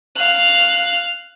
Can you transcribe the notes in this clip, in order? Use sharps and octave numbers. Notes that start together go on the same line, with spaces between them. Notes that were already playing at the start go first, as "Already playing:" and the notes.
F5 F#6